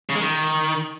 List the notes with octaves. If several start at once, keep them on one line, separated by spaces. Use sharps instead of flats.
C#3
G#3
D#3